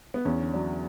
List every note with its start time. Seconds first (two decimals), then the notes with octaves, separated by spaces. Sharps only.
0.14 B3
0.25 E2 C#4
0.39 D3
0.54 F#3 D4